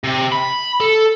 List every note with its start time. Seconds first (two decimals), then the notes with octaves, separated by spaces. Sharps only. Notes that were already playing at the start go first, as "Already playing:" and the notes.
0.04 C3
0.32 B5
0.81 A4